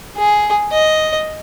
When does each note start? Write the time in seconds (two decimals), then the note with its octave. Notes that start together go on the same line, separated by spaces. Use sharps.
0.17 G#4
0.71 D#5